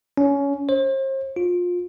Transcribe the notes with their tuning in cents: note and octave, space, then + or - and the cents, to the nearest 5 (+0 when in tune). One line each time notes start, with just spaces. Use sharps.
C#4 +20
C5 +40
F4 +25